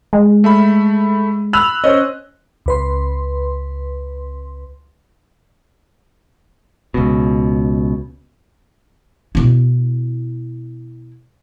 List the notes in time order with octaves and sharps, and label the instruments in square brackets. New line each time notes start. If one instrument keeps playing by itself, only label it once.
[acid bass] G#3
[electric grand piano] A3 E5 B5
[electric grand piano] B5 [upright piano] E6 F#6 F7
[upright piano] C#4 C5 [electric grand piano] D#5
[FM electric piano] C#2 B4 C6
[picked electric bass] C#2 B2
[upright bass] B2 E4